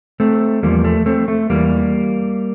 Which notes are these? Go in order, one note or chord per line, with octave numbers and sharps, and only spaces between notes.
A3 C4
E2 D3 F3 G3 A#3
A3
A3 C4
A3
E2 E3 G3 A#3